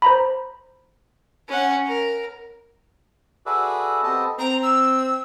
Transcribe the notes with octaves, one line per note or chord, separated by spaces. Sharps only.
C5 A#5 B5
C#4 F#5
A#4
F#4 G#4 A4 B4 D5 E5
B3 C4 G4 A4 D#5 A5
C4 A#5
E6